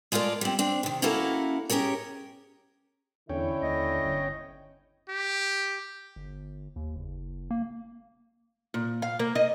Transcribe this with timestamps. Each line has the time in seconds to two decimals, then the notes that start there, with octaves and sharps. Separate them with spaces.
0.12 G#3 A3 F4 A#4 D5
0.41 G3 C4
0.59 C4 D4
0.83 C3 D#3
1.02 A#3 C#4 E4 F#4 A4 A#4
1.70 C#4 G4 G#4 A#4 C#5
3.30 E2 D3 C#4 E4 C#5 G5
3.62 D#2 D#5
4.05 G1
5.09 G4
6.16 G1
6.76 D#2
6.96 F#1
7.51 A#3
8.74 A#2
9.02 F5
9.19 A#3
9.35 D#5